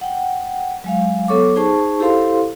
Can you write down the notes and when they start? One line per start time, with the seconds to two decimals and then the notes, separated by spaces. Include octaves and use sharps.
0.01 F#5 G5
0.84 F#3 G#3 F5
1.28 F#3 B3 A4 C#5 C#6 D6
1.56 D#4 G#4 C5 A5 C#6
2.00 E4 G4 A4 C5 F5 C6